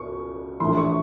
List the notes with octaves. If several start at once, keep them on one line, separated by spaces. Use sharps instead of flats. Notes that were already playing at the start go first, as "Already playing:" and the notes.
Already playing: C#2 B2 C#6
A#1 A2 E3 C6
C#6